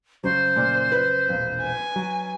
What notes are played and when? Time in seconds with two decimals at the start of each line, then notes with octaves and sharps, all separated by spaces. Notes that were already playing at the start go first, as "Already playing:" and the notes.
0.24 F2 C#3 F#3 C5
0.56 A#2
0.92 B4
1.29 E1 A#1 F2
1.63 G#5
1.96 F#3